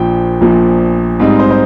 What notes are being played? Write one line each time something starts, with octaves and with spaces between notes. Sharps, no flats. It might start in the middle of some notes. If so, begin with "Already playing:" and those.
Already playing: A#1 A#2 F3 G5
A#1 A#2 F3
G#2 G3 C4 D#4
C5
C5